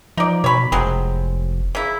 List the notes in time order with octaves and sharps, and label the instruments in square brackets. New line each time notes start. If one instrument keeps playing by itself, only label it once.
[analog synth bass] F3 [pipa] D#4 D5
[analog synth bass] B2 [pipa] C#5 B5
[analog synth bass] F1 [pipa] F#3 G#3 C4
[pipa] C#3 E4